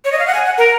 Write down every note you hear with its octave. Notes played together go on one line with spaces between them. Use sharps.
C#5
D#5
F5
F#5
G#5
F#5
A#4